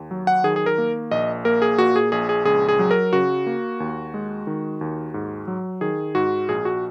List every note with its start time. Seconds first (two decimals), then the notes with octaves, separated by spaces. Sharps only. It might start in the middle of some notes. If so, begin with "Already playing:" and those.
Already playing: D#2
0.11 F#3
0.27 F#5
0.44 D#3 G#4
0.56 G#4
0.66 A#4
0.78 A#3
1.11 A#1 D#5
1.45 A#3 A#4
1.62 G#4
1.78 A#2 F#4
1.96 G#4
2.12 A#1 G#4
2.29 G#4
2.45 C#2 G#4
2.68 G#4
2.79 F#3
2.91 A#4
3.13 C#3 F#4
3.47 A#3
3.80 D#2
4.14 G#3
4.47 D#3
4.81 D#2
5.14 G#2
5.48 F#3
5.81 D#3 G#4
6.15 G#2 F#4
6.49 A#1 G#4
6.65 F#4